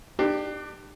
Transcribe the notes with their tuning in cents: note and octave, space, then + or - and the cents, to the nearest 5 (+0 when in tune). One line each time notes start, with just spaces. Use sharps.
D4 +35 G4 +0